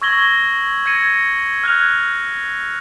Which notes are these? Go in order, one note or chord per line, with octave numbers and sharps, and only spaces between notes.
C#6 E6 G#6 A#6 F#7 G7
G#6 A#6 C#7 D#7
F6 F#6 G#6 F7